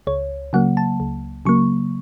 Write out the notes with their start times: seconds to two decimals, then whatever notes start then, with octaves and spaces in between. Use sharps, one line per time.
0.07 C#2 C#5
0.53 C#3 F#3 A#3 F#5
0.77 A5
1.00 C#2
1.45 C#3 F#3 A#3 C#6